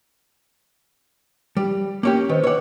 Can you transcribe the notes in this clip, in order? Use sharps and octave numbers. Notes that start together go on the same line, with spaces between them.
G3
A#3 C#4 G4
D#3 B4 C5
B4 C#5 F#5 D6